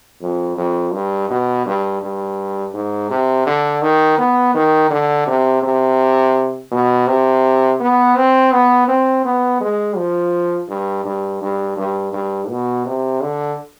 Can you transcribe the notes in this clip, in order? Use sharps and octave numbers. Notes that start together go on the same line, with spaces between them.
F2
F2
G2
B2
G2
G2
G#2
C3
D3
D#3
B3
D#3
D3
C3
C3
B2
C3
B3
C4
B3
C4
B3
G#3
F3
G2
G2
G2
G2
G2
B2
C3
D3